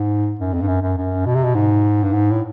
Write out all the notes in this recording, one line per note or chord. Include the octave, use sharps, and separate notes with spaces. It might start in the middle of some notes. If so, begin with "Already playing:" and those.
Already playing: G#2
F#2
F2
G2
F#2
F#2
F#2
B2
C3
B2
G#2
G2
G#2
A2